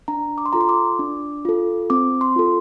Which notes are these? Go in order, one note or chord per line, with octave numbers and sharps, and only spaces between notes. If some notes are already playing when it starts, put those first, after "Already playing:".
D4 A#5
D6
C6
F4 A4 A#5
C6
D6
D4
F4 A4
C4 D6
C6
F4 A4